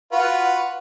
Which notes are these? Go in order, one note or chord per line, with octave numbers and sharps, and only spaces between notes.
F4 F#4 B4